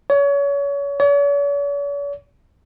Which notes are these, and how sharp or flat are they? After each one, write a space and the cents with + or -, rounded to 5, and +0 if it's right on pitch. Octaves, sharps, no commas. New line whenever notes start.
C#5 +30
C#5 +45